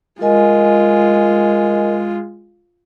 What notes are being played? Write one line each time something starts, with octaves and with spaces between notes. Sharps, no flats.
G#3 F4 A#4 D#5 G#5